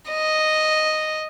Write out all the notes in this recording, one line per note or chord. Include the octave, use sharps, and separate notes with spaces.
D#5